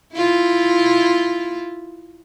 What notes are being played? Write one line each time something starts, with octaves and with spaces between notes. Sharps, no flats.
E4 F4